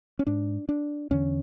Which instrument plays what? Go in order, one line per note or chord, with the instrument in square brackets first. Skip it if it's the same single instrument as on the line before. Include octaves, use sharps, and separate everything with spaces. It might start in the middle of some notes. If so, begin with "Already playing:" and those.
[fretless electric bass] C#4
G#2 D4
D4
E2 D3 C#4